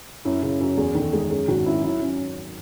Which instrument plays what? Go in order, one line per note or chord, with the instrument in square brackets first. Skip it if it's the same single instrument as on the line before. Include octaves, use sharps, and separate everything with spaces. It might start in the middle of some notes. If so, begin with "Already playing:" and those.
[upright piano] F#2 [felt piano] E4
[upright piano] C#3 [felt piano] E4
[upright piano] F#2 [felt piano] F#4
[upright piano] E2 [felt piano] G#4
[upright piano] D#3 [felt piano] A4
[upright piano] G#3 [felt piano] G#4
[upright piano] F#2 [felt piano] G#4
[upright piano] G#1 [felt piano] F#4
[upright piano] F#2 [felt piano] E4
[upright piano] F#3 [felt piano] E4
[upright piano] F#3 [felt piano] C#4